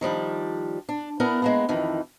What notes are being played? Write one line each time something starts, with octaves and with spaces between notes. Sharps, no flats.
D#3 F3 G3 D4
D4
B3 D4 E4 A#4
G#3 A#3 B3
F2 D#3 E3